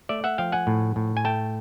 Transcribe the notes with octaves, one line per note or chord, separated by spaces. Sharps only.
A3 D5 E5
E5 F#5
F3 F5 G5
F#5 G#5
A2
A2
G#5
A3 G5 A5